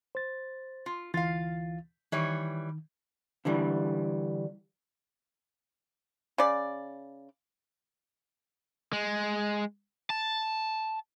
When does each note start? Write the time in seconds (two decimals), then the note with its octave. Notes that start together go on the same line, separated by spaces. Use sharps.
0.15 C5 A6
0.86 F4
1.14 D2 E3 F4 F5 A6
2.12 D#3 E3 G3 C#5
3.45 D3 E3 G3
6.38 C#3 D5
8.93 G#3
10.10 A5